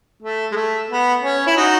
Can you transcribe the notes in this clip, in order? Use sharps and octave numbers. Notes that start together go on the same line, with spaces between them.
A3
G#3
A3
B3
C#4
E4
D#4 F#4